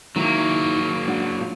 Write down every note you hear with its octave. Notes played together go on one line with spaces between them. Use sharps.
D#3 F#3 A#3 E4
D4 F#4
F4